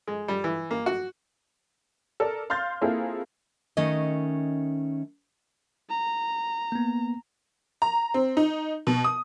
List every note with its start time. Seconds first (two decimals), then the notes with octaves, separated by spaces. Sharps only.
0.07 G#3
0.28 G3
0.44 E3
0.71 A#3
0.86 F#4
2.20 A4 A#4 D5
2.50 F5 C6 F6 G6 A6
2.81 A#3 C4 E4 F4 G#4 A4
3.77 D#3 A3 C#4 D#5
5.90 A#5
6.72 A#3 B3
7.82 A#5
8.14 C4
8.37 D#4
8.87 B2
9.04 D#6